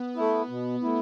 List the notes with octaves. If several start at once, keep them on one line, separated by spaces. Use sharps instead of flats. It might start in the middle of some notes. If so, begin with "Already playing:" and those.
Already playing: B3
A3 E4
B2
A3 E4